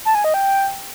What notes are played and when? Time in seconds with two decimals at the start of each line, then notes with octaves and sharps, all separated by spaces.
0.05 A5
0.15 G#5
0.24 D#5
0.34 G5